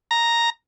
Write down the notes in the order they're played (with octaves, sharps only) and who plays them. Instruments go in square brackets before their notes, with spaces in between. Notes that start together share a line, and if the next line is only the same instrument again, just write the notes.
[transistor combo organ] A#5